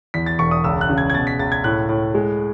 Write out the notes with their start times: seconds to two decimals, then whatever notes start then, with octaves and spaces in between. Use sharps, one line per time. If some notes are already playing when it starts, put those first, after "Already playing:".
0.14 E2 B6
0.26 A6
0.39 E1 C#6
0.51 D#6
0.64 C#2 E6
0.81 F#6
0.89 C#3
0.98 G#6
1.10 G#6
1.14 B2 A6
1.27 B6
1.39 C#2 A6
1.52 G#6
1.64 A2 F#6
1.89 A2
2.14 G#3